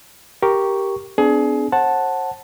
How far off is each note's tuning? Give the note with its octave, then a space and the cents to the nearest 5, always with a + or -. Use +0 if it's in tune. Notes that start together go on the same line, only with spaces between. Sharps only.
G4 -5 A#4 +0 C#6 +0
B3 +45 D4 +0 G#4 +25
C5 +40 F#5 +0 A5 +0